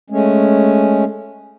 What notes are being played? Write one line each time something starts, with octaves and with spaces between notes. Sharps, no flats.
G#3 A3 C#4